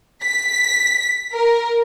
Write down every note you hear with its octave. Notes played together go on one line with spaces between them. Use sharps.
B6
A#4